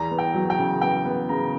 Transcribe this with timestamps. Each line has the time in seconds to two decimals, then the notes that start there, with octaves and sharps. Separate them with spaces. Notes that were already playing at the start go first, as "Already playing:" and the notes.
Already playing: E2 A#5
0.11 B3
0.19 G5
0.34 F#3
0.50 G5
0.58 C#3
0.82 B3 G5
1.05 B3
1.29 C#3 A#5